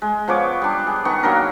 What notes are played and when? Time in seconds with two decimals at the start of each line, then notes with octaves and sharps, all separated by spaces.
0.02 G#3
0.28 F3 B3 C#5 D6
0.62 G3 D4
0.87 G#4
1.05 D#3 B3 C#6
1.23 F#3 A#3 D4 A#4